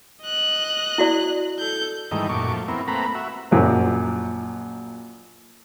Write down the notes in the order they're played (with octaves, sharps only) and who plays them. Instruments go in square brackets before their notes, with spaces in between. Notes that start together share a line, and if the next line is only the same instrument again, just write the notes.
[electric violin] D#5 F#6
[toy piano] E4 F#4 D5
[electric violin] A4 G6
[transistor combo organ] G#2 D#3 E3 G3 A3 D#4
F#2 A#2 A3 C#6 D6
F3 A3
B3 C4 E4 A#4
A3 A#3 C4 B4 A#5 B5
F#4 E5
[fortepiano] A#1 F#2 A#2